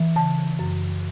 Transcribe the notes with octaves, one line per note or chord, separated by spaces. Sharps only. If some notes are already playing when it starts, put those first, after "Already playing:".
Already playing: E3
C#3 A5
F#2